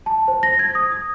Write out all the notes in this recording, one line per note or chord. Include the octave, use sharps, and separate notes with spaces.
A5
C5
A#6
G#6
D#6
D#6